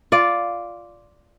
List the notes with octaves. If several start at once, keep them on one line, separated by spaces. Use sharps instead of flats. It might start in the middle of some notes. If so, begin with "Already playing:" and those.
F4 D5